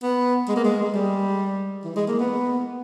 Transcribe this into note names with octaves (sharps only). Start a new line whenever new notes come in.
B3
G#3
A#3
G#3
G#3
G3
E3
G#3
A#3
B3